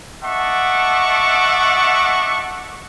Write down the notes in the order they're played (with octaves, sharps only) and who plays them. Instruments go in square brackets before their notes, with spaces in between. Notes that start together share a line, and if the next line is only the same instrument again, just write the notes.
[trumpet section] D#5 E5 F#5 A5 C#6 D6